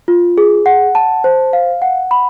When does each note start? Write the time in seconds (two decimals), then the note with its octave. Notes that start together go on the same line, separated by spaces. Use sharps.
0.08 F4
0.38 G#4
0.66 F#5
0.95 A5
1.24 C5
1.53 F5
1.82 F#5
2.11 B5